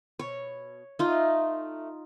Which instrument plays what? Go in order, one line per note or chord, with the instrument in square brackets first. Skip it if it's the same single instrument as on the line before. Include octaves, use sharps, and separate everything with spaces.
[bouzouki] B2 [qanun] C#5
[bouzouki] A3 E5 [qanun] D#4 F4